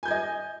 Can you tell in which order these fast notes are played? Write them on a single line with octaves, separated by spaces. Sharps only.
G#5 G6 G#6 D#5